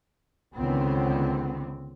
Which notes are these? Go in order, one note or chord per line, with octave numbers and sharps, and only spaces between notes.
C#2 D3 D#3 B3 C4